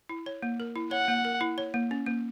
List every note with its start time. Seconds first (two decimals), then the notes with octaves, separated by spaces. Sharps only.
0.09 E4
0.26 C#5
0.42 A#3
0.60 A#4
0.76 E4
0.91 C#5 F#5
1.08 A#3
1.25 A#4
1.41 E4
1.58 C#5
1.74 A#3
1.91 C#4
2.06 A#3